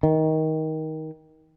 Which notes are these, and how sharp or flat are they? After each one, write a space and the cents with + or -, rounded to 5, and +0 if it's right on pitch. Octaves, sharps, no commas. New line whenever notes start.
D#3 +20